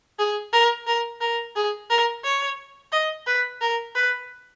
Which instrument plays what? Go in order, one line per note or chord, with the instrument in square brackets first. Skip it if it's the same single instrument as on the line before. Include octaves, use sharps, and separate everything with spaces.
[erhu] G#4
A#4
A#4
A#4
G#4
A#4
C#5
D#5
B4
A#4
B4